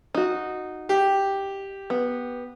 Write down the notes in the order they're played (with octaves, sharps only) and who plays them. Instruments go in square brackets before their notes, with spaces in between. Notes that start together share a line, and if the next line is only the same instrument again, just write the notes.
[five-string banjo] D#4 F#4
[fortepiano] G4
[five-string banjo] B3